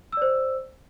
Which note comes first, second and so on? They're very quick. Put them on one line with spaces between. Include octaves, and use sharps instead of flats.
E6 D5 C5